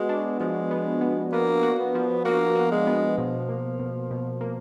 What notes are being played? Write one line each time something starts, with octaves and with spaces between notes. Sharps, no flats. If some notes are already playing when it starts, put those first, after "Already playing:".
Already playing: G#3 B3 F#4
D4
F3 G#3
B3
B3
A#3 B3
F#4
B3
F3
A#3 F#4
F#4
G#3
B3
B2 F3
A#3
B2
B2
A#3